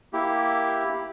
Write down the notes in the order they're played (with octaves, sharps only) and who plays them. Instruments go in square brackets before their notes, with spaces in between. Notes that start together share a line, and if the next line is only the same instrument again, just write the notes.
[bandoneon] A#3 E4 G4